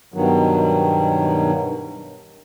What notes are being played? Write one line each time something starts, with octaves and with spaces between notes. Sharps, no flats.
G2 B2 D#3 F#3